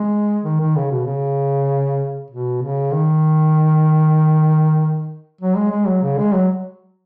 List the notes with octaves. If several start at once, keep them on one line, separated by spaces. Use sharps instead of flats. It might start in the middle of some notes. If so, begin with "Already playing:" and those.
Already playing: G#3
D#3
D#3
C#3
B2
C#3
B2
C#3
D#3
F#3
G#3
G#3
F#3
C#3
G#3
F#3